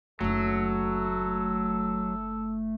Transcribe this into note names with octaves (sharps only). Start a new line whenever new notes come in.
F#1 D#3 F#3 A3 A4